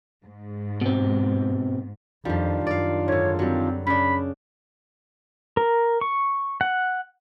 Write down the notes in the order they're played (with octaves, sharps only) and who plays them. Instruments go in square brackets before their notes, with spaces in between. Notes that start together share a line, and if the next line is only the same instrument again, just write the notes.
[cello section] G#2
[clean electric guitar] B2 C4
[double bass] F2 [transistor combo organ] D#3 D4 F4 [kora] F3 G3
[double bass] F#2 [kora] D5 F5
[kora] G#2 D3 [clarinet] C#5
[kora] F#3 G3 [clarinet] C4
[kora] C#3 D4 [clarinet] B5
[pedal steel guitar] A#4
C#6
F#5